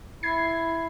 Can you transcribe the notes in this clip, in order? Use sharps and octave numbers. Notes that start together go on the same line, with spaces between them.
E4 G#6 C7